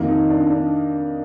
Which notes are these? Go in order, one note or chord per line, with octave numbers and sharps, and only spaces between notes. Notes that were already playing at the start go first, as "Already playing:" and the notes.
Already playing: F2 D#3 A#3
D#4
D4
D4